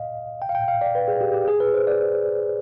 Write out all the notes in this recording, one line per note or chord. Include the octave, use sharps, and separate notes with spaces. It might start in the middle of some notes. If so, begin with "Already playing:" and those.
Already playing: D#5 F5
G5
F5
G5
F5
D5
B4
G#4
G4
G4
G#4
B4
C5
D5